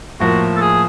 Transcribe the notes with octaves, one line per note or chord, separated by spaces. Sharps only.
A2 F3 A#3 F#4
A4
G#4